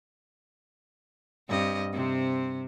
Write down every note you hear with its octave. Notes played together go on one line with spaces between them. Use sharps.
G2 C4 D#5
C3 C4